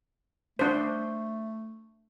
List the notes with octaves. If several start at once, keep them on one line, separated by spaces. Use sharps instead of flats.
A3 D4 C5